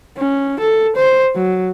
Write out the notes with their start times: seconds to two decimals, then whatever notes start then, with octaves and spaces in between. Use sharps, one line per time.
0.17 C#4
0.60 A4
0.96 C5
1.35 F#3